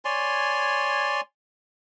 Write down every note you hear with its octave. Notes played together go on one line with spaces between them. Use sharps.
C#5 D5 G#5 C6